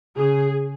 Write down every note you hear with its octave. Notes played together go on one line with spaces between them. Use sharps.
C#3 G#4